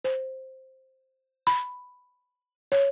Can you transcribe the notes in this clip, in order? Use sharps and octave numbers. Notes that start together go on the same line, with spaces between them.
C5
B5
C#5